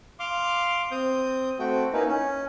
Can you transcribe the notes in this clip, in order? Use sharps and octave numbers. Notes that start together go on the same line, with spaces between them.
F5 C6 D6
C4 D#6 G6
A3 C4 F#4 G5
A#3 C#4 D#4 E4 B4
C#4